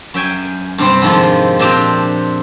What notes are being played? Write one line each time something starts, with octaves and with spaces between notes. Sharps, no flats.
F#2 E5 G5 G#5
G2 C3 C4
F2 G#2 D#3 F3
A#2 C4 D4 G4 A#5